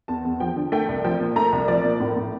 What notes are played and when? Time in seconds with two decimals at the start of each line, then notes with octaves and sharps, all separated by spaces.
0.08 E2 A5
0.25 E2
0.40 F3 G5
0.56 D3
0.72 A3 G5
0.89 C2
1.04 F3 G5
1.20 A#2
1.36 A3 A#5
1.52 C2
1.68 F3 D5
1.84 A#2
2.00 A2
2.16 A2